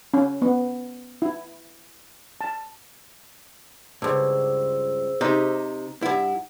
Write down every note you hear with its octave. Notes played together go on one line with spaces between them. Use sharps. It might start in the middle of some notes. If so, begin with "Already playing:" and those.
C#4
B3
E4
A5
C#2 G2 G#4 C5 E6
C3 D#4 G4
G2 E4 F#5